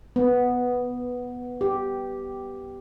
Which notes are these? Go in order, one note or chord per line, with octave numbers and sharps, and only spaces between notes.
B3
G4